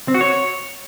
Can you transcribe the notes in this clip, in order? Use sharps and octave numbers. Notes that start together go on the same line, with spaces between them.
C4
F#4
C#5